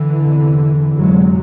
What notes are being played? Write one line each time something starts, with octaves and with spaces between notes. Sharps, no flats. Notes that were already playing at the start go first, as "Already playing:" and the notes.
Already playing: D3 E3
E2 C3
F2 C3 F#3 G#3